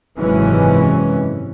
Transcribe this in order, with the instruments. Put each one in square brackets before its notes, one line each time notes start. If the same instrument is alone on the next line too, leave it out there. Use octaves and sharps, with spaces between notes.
[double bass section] G#1 F#2 C3 E3 G#3 C#4